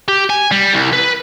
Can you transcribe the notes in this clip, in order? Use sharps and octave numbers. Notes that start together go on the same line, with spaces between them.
G4
G#5
G3
C2
B4